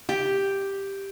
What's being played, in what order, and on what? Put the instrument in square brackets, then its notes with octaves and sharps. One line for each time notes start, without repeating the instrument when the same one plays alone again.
[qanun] G4